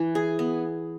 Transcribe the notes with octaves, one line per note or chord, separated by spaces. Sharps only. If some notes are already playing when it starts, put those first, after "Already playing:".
Already playing: E3
G#4
B3